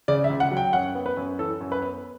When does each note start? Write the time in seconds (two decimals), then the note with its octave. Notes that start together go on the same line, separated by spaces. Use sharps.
0.08 C#3 D5
0.24 E5
0.30 C#2
0.40 F#5
0.51 F#3
0.57 G5
0.73 F#2 F#5
0.95 B3
1.06 B4
1.17 F#2
1.39 E3 A4
1.61 F#2
1.72 B4
1.83 B3